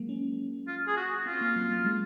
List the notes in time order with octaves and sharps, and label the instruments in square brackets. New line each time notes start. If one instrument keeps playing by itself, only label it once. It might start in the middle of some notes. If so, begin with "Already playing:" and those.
Already playing: [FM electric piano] F#3 G#3 A#3
C#4
[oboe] F4
G#4
F#4
[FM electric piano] C4 [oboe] F4
[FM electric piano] A#3
F#3
F#3
G#3